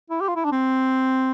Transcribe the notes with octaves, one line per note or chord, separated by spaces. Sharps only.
E4
G4
F4
E4
D4
C4